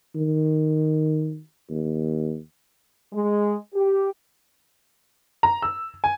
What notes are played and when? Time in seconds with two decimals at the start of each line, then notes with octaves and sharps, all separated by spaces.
0.15 D#3
1.70 D#2
3.13 G#3
3.74 G4
5.43 A#5
5.62 E6
6.04 G#5